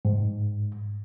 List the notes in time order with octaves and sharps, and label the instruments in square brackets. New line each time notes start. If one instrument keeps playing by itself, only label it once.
[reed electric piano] G#2